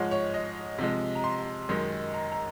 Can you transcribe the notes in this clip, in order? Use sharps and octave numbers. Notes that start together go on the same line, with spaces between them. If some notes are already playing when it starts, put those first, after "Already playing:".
Already playing: G#2 F3 G#3 C#5
C#5
D#5
C3 F3 G#3
A#5
C6
F#2 D#3 G#3
A#5
A#5